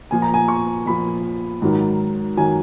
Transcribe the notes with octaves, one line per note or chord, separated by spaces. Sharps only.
A#2 F3 G#5
A#5
G#5
C#6
A#2 F3 B5
G#2 D#3 F#3
D#3 F#3 G#5